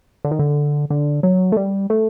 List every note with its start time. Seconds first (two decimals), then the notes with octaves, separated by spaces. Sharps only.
0.25 D3
0.31 D#3
0.39 D3
0.90 D3
1.23 F#3
1.52 A3
1.57 G3
1.90 A3